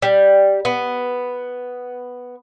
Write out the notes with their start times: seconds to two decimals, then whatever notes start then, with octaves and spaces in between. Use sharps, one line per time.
0.02 G3
0.65 B3